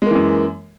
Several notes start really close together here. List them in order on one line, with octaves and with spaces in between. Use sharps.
G#3 A#3 E3 F#2